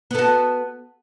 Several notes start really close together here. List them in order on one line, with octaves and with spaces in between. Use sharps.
B3 A4 F#4